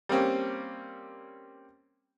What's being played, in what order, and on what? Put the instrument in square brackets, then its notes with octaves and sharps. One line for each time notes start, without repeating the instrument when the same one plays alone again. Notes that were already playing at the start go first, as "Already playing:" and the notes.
[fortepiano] G3 A#3 C4 C#4